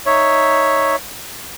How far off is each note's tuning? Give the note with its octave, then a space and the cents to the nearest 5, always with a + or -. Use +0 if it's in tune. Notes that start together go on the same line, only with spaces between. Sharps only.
D#4 +0 C#5 +0 E5 +0